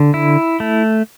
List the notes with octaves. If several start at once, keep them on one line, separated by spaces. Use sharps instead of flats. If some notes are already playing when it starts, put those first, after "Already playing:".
Already playing: D3
E4
A3